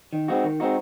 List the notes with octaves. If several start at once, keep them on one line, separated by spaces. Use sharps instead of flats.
D#3
G#3 C4 D#4 F#4
D#3
G#3 C4 D#4 F#4